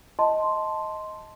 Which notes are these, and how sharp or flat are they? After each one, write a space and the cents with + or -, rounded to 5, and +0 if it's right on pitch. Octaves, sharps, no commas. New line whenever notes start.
D#5 +15 A5 +0 C6 +0